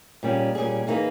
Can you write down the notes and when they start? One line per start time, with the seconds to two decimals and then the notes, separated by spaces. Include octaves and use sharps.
0.23 A#2 G3 C#4 G#4
0.55 A#2 G3 C#4 G#4
0.87 E3 A#3 D#4 G#4